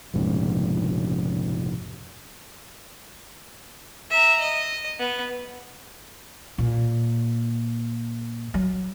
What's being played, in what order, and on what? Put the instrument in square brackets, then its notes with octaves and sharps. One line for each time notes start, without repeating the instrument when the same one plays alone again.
[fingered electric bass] F1 A#1 G#2 C#3
[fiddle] E5 A#5
D#5
B3
[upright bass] A#2
F#3